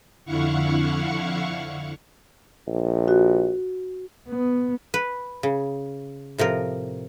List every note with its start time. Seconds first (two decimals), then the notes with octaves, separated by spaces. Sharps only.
0.25 F2 D3 E4 F5 F#5 C#6
2.67 A#1
3.08 F#4
4.29 B3
4.94 B4
5.43 C#3
6.38 A2 C3 F3 A#4